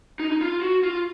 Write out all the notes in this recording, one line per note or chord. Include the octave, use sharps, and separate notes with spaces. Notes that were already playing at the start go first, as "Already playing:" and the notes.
D#4
D#4
F4
F#4
F4